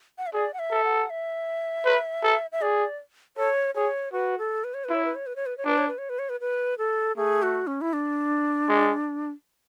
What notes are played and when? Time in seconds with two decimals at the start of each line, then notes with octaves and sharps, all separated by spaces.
0.18 F#5
0.27 E5
0.33 G#4 D5
0.54 F#5
0.59 E5
0.71 A4
0.84 F#5
1.10 E5
1.85 B4
2.24 A4
2.52 E5
2.61 G#4 D5
3.37 A4 C#5
3.75 G#4 C#5
4.13 F#4 B4
4.38 A4
4.64 B4
4.74 C#5
4.84 E4 B4
4.94 C#5
5.05 B4
5.15 C#5
5.27 B4
5.36 C#5
5.46 B4
5.58 C#5
5.65 D4 B4
5.78 C#5
5.88 B4
5.98 C#5
6.09 B4
6.19 C#5
6.29 B4
6.40 B4
6.78 A4
7.17 A3 G#4
7.43 F#4
7.67 C#4
7.81 E4
7.93 D4
8.69 G#3